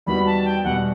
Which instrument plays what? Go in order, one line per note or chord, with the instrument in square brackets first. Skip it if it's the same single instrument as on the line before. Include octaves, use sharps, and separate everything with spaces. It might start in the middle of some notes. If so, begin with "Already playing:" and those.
[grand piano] E2 D#3 G3 B3 F#4 [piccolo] B5
[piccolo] A5
G5
[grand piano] E2 B2 G3 [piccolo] F#5